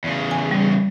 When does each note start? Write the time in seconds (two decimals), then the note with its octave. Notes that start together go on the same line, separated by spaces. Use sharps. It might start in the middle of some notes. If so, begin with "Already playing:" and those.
0.04 E2 C#3
0.31 G#5
0.51 G3